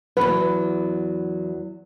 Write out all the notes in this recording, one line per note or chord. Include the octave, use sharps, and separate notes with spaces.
E2 F#3 B4